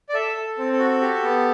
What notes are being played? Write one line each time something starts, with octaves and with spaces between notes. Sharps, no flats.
D5
A4 E5
A4
C4
A4
F#4
G4
B3